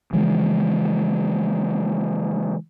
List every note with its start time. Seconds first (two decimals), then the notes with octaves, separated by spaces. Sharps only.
0.13 C#3 E3 F3 G#3